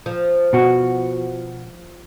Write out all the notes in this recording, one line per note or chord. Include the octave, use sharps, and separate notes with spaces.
F3
B2 F#4